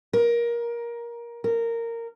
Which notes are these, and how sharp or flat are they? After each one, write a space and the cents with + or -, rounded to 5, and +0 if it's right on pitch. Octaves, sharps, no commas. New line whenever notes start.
A#4 +20
A#4 -15